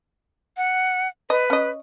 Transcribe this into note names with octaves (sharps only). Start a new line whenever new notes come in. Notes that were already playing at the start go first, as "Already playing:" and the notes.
F#5
B4 D#5
C#4 D#5